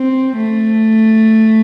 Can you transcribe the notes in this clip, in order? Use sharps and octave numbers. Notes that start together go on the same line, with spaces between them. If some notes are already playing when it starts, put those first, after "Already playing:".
Already playing: C4
A3